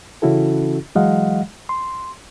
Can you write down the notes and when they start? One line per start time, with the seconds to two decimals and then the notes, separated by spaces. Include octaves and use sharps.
0.22 C#3 E3 C#4 E4 F#4 A4
0.96 E3 F#3 G#3 D#5 F5 F#5
1.69 C6